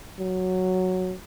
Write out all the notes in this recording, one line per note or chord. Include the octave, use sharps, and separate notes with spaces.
F#3